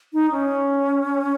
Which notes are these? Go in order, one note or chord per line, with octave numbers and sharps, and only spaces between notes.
D#4
C#4